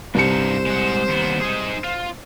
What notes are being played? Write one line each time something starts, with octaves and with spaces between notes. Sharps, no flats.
C2 G2 D#4 C5 C#7 E7
G#3 F#5
D#2 B3
D#4 G#4
F4